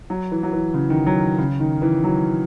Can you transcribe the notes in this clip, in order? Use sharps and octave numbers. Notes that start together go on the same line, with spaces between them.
F#3
E3
F#3
E3
C#3
D#3
F#3
C#3
D#3
E3
F#3